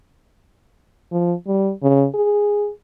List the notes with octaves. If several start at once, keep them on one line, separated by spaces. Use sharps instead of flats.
F3
G3
C#3
G#4